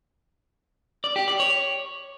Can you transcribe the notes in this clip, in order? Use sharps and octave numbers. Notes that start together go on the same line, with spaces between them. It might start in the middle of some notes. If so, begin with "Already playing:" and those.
D5
G4
D5
C#5